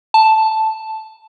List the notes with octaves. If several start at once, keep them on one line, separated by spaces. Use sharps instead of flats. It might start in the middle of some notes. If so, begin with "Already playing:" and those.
A5